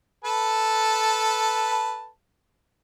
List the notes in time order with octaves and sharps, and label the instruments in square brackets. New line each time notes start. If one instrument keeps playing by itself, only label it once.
[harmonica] A4 B4 A5